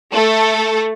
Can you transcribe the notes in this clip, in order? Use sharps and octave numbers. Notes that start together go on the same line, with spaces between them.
A3 A4